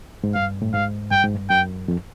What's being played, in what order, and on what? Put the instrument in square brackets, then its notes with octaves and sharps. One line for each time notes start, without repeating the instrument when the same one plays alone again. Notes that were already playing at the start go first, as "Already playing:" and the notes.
[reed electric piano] G#2
[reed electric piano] G2 [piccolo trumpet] F5
[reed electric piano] A2
[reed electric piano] G#2 [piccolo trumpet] F5
[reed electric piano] G2 [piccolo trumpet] G5
[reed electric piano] G#2
G2
[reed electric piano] F#2 [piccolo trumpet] G5
[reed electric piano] F2